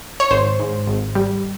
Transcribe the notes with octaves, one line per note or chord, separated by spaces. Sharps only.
C#5
G#1 C5
G#2
G#1
G3